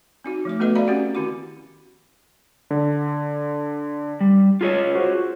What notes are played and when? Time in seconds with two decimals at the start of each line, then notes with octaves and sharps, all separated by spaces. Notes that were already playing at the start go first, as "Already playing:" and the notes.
0.24 C4 D#4 F#4
0.45 F3 A3 D6
0.60 A3 B3 F#4 A4 B4 D#5
0.75 F#4 D5 E5 F5 A#5 B5
0.87 C4 C#4 F#4 G4 F#5 G5
1.15 D#3 C4 E4 F#4 D6
2.71 D3
4.21 G3
4.61 F4 G#4 C#5
4.95 F#4 C5